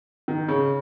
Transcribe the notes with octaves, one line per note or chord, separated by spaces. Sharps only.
D#3
C#3